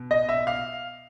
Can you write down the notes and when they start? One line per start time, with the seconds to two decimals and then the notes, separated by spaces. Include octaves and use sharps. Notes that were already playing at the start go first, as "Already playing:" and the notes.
Already playing: B2
0.11 D#5
0.29 E5
0.47 F5